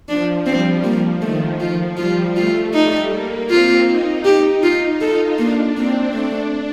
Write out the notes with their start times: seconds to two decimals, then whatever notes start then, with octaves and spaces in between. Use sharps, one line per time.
0.08 F3 D4
0.46 G3 C4
0.84 F3 A#3
1.21 D#3 A3
1.60 F3 F4
1.97 G3 F4
2.36 A3 F4
2.74 G3 D#4
3.11 A#3
3.50 C4 F4
3.87 D#4
4.25 G4
4.63 F4
5.01 F4 A4
5.38 A#3 D4
5.76 A#3 C4
6.14 A3 D4